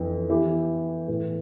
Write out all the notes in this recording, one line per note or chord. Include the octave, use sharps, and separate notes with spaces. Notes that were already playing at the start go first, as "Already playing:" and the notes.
Already playing: F2 E3 B3 D4
E3 B3 E4 G4
A2 E3 B3 E4